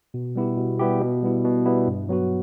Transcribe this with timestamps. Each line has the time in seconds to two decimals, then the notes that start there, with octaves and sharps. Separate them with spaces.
0.14 B2
0.36 G3 B3 E4 G4
0.57 B2
0.79 G3 B3 E4 G4
1.01 B2
1.23 G3 B3 E4
1.45 B2
1.66 G3 B3 E4
1.87 G2
2.09 F#3 B3 F#4